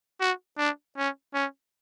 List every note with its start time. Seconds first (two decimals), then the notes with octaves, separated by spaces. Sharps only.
0.20 F#4
0.58 D4
0.97 C#4
1.34 C#4